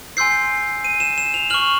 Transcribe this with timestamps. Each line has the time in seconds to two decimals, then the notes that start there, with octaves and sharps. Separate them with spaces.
0.17 G#5 C6 E6 G6 C7
0.84 D#7
1.00 E7
1.18 E7
1.34 F7
1.50 C#6 F6 F#7